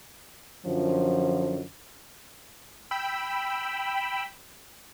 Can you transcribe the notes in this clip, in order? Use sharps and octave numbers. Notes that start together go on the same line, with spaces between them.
F#2 D3 F3
G5 B5 E6